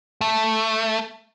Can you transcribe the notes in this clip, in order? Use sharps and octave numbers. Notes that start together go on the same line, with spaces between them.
A3